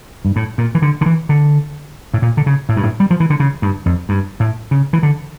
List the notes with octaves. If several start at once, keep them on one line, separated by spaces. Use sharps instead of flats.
G2
A2
A#2
E3
D3
D3
E3
D3
A2
A#2
D3
C#3
A2
G2
A2
G3
F3
E3
D3
C#3
G2
F2
G2
A2
C#3
E3
D3